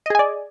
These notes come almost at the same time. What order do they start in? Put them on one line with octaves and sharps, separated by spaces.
D#5 G#4 G#5 D5